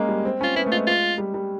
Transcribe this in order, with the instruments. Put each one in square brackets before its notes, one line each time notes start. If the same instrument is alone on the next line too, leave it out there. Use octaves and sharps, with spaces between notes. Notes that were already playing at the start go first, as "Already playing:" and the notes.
Already playing: [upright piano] G#3 A#3 C#4
G3
C4
[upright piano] C#4 [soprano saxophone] F4
[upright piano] B3 [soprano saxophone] E4
[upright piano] A3
[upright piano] G#3 [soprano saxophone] F4
[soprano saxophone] F4
[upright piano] G3
G3